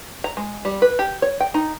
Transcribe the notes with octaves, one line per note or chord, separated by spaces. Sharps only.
A#5
G#3
G3
B4
G4
C#5
G5
D#4